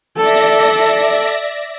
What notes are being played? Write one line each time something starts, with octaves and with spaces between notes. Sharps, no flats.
A4 D5 E5 A#6